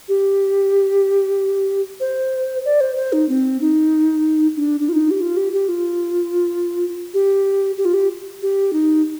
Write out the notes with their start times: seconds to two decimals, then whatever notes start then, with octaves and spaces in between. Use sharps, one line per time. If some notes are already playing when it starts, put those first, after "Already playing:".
0.09 G4
2.00 C5
2.65 D5
2.81 C5
2.96 C5
3.13 D#4
3.29 C4
3.61 D#4
4.57 D4
4.80 D4
4.89 F4
4.93 D#4
5.11 G4
5.21 F4
5.37 G4
5.53 G4
5.69 F4
7.14 G4
7.78 G4
7.85 F4
7.94 G4
8.42 G4
8.73 D#4